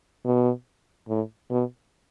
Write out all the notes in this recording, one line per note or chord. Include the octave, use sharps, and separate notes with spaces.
B2
A2
B2